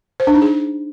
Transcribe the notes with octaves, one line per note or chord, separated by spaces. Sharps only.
C5
D4
D#4
G#4